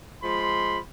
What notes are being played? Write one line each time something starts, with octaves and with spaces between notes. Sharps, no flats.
F3 G#3 B5 C6